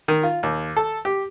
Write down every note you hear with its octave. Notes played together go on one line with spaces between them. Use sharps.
D#3
F4
D#2
A4
G4